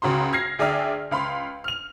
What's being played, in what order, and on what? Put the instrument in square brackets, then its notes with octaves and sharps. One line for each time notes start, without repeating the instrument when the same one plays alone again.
[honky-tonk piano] C#2 C#3 F#4 A#5 C6
F6 G#6 A#6 C7
D2 G#4 D5 E5 G5 F6
C#2 F5 B5 C6
F6 F7